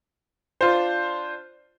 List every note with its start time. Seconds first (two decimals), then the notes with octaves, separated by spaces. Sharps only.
0.61 D4 F4 C5